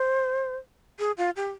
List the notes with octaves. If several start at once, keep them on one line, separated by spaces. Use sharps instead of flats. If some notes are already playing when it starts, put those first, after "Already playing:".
Already playing: C5
G#4
F4
G4